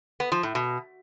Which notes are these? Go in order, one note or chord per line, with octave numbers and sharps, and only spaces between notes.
B3
F3
A2
B2